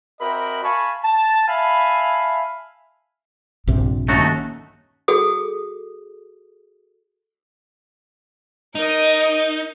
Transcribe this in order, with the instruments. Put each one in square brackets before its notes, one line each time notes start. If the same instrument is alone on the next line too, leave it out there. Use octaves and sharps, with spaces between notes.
[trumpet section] C4 F#4 A#4 D#5 E5 B5
F5 G#5 A5 B5 C#6
A5
E5 F5 G#5 A5 B5
[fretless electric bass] A#1 C3 [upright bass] G2
[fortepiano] D#2 C#4 [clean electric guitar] A3 D#4 F#4
[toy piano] F#4 G#4 A4 D#6
[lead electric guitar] D#4 [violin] A#4 D#5